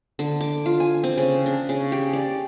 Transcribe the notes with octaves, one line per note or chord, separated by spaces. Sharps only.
D3
D6
F4
G#5
C4
C#3
D4
C#3
G4
D5